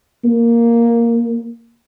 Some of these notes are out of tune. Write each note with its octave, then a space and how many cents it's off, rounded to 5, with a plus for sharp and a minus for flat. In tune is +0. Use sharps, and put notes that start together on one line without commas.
A#3 +0